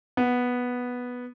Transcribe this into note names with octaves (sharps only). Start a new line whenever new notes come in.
B3